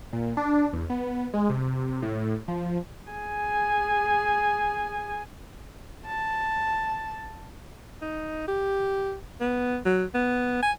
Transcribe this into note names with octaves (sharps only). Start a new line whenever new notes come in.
A#2
D4
E2
B3
G#3
C3
A2
F3
G#4 G#5
A5
D#4
G4
B3
F#3
B3
G#5